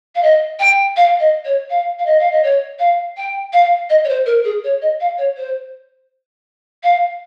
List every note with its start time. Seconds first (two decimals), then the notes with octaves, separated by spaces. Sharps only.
0.15 F5
0.23 D#5
0.60 G5
0.97 F5
1.20 D#5
1.45 C#5
1.70 F5
1.99 F5
2.06 D#5
2.20 F5
2.32 D#5
2.43 C#5
2.79 F5
3.17 G5
3.53 F5
3.90 D#5
4.04 C#5
4.09 C5
4.26 A#4
4.44 G#4
4.64 C#5
4.82 D#5
5.01 F5
5.18 C#5
5.37 C5
6.83 F5